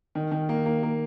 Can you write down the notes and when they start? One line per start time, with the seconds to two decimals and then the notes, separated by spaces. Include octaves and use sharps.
0.15 D#3
0.32 D#3
0.49 A#3
0.66 A#3
0.83 A#3